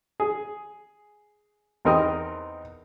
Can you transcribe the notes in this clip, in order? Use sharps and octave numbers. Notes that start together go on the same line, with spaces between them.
G#4
E2 C4 D#4 A#4 G5 D#6